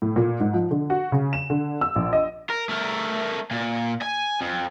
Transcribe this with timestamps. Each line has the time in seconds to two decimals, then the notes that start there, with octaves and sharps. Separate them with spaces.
0.02 A2
0.16 A#2
0.40 G#2
0.54 F3
0.71 D3
0.90 F#4
1.12 C#3
1.33 E7
1.50 D3
1.81 E6
1.96 A#1
2.13 D#5
2.50 A#4
2.69 A3 A#4
3.51 A#2
4.02 G#5
4.41 F2